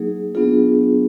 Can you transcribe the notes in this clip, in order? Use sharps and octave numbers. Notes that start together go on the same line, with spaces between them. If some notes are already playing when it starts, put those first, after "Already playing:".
Already playing: F#3 A#3 D#4 G#4
F#3 B3 D4 F4 G#4